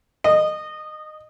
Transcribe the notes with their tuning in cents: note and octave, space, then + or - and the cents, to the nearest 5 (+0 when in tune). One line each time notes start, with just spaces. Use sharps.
D#5 -20 D#6 +0